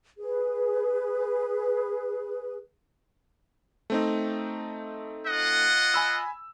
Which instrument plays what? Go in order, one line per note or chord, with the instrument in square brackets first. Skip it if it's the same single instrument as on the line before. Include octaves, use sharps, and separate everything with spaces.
[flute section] G#4 B4
[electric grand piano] A3 C4 D#4
[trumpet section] F4 D#5 F#5
[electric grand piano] G#5 B5 E6